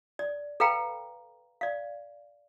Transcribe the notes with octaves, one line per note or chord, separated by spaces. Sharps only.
D5
A4 B4 F5 G5 A#5 B5
D5 F5